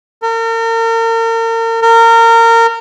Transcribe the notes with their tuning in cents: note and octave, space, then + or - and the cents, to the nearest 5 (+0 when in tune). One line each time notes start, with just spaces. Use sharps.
A#4 -40
A#4 -25